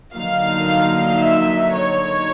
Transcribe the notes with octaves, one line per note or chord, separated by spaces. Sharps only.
D3 F#3 A#3 D#4 F5
E5
C#5